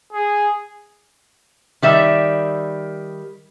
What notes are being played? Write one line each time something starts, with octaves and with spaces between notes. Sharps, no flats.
G#4
D#3 G3 E5